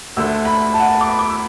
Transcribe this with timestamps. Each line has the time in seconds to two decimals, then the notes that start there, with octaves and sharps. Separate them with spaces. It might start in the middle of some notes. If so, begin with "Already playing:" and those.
0.17 D2 D3 A3 E6
0.45 B5
0.74 A5
0.80 F#5
0.88 A5
1.01 D6
1.09 B5
1.19 D6
1.29 E6